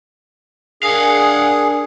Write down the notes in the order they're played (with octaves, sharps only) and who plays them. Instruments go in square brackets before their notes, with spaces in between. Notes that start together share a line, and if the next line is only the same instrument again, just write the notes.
[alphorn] D4 [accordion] G#4 [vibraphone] A#4 G#5 [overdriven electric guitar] F5 F#5